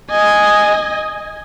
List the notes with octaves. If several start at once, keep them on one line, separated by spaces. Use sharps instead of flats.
D#5 G#5